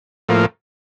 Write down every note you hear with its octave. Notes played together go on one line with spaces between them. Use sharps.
A2 F3 A#3